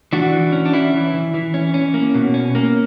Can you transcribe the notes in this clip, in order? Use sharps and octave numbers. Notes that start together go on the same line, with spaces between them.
E3 D4 F#4
E3
C#4
D4
E3 E4
E3
E3
E3
C#4
C#4
A#3
B2
C#4
A#3